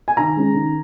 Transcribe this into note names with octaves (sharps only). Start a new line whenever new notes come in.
G#5
D#3 A#5
G#3 C#4
D#3